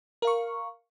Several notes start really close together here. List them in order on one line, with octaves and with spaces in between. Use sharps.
A#4 F5 C#6